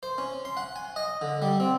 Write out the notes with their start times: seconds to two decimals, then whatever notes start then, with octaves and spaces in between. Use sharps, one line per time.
0.03 C5
0.18 C#4
0.45 C6
0.57 F#5
0.76 G#5
0.96 D#5
1.21 D3
1.42 G3
1.60 C4